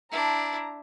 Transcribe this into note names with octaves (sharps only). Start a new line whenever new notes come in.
D4 E4 A5 A#5